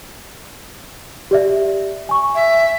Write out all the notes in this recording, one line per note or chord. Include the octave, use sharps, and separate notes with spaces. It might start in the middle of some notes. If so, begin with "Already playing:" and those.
G4 D5 E5
G#5 C#6
E5